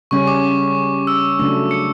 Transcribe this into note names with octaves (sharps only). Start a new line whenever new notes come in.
C#3 G3 C#4 C#6
D6
E6
C#3 F#3 A3 D4
C#7